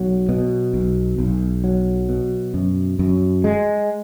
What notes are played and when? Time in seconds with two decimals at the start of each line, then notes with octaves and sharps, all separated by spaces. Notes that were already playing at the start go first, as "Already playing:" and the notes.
Already playing: B1 F#3
0.29 B2
0.74 B1
1.19 B1
1.64 F#3
2.09 B2
2.54 F#2
2.99 F#2
3.44 G#3